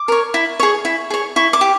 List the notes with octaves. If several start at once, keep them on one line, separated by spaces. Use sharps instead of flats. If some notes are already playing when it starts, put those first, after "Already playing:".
Already playing: D6
A#4 C#5
E4
G#4 C#5
E4
G#4 C#5
E4 C#6
D6
G4